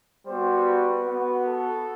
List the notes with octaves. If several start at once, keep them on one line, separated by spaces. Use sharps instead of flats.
G3 B3 F#4 C5
B4
B3 F#4
A4